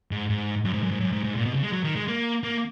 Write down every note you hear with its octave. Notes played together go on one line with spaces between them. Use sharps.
G#2
G#2
F#2
G#2
F#2
G#2
F#2
G#2
G#2
A#2
B2
C#3
G#3
F#3
D#3
G#3
A#3
A#3